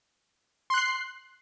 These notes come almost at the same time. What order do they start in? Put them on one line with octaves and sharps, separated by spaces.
C6 F#6 C7